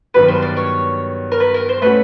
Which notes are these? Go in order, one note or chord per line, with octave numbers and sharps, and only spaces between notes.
G2 D#3 F#3 B3 B4
C5
D5
C#5
A#4
B4
A#4
C5
A3 C#4 F#4 B4